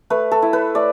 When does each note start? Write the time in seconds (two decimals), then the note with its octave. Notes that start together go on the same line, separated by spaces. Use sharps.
0.10 A3 B4
0.31 A4
0.42 E4
0.53 B4
0.75 A3 D5